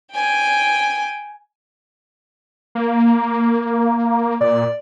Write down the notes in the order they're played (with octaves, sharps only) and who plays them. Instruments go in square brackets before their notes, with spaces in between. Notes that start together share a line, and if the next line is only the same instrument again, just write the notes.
[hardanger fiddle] G5 G#5
[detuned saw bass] A#3
[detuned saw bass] A#2 [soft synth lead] D5